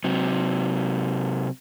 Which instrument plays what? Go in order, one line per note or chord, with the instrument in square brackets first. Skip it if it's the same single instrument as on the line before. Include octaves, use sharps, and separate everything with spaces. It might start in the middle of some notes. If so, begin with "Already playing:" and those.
[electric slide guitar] C3 F#3